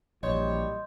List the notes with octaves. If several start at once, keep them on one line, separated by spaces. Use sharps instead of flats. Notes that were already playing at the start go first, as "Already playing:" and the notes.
A#1 E3 F#3 G3 C#5 D#5 C6 G6